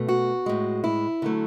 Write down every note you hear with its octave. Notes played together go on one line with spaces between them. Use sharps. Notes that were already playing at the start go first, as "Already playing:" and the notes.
Already playing: B2 A3
F#4
A2 G#3
E4
D3 F#3 A3